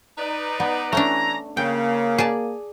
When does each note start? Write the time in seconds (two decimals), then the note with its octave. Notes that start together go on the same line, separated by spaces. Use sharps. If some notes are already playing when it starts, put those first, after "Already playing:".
0.18 D#4 B4 D5
0.60 B3
0.93 E3 A3 C#4 D4 A#5
1.57 C#3 A#3 G5
2.18 G#4 D5 A5